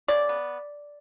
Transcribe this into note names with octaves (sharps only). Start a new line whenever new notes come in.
C#3 D5
B3